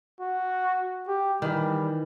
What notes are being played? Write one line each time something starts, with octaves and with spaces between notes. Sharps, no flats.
F#4
G4
D#3 E3 G3